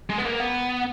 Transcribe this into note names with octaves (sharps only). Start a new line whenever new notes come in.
G#3
B3
A#3
B3